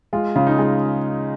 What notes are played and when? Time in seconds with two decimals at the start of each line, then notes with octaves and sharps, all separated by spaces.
0.13 G#3 F4
0.36 C#3 F4
0.47 D#4
0.58 G#3 F4